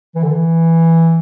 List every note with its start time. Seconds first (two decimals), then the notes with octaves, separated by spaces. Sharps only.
0.15 E3
0.23 D3
0.32 E3